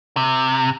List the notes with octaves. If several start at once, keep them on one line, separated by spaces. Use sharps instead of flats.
C3